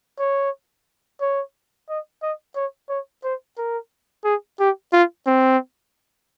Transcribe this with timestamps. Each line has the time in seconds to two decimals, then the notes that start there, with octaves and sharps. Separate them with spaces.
0.19 C#5
1.21 C#5
1.89 D#5
2.22 D#5
2.56 C#5
2.89 C#5
3.24 C5
3.58 A#4
4.25 G#4
4.60 G4
4.93 F4
5.27 C4